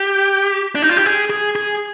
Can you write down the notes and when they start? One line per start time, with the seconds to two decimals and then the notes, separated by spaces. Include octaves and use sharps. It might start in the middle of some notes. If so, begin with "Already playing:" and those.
Already playing: G4
0.75 D4
0.82 D#4
0.89 F4
0.97 G4
1.06 G#4
1.30 G#4
1.55 G#4